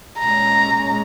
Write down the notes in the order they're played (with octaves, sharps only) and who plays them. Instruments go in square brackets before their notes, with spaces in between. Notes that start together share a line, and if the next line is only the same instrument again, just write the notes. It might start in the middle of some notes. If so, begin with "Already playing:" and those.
[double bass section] A#2 G#3 C#4 [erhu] A#5